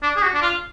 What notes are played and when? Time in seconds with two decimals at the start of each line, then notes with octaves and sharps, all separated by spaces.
0.02 D4
0.16 G#4
0.22 F#4
0.34 D4
0.42 F4